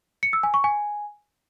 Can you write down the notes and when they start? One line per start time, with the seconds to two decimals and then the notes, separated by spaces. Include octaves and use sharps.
0.23 C#7
0.33 E6
0.43 G#5
0.54 C#6
0.64 G#5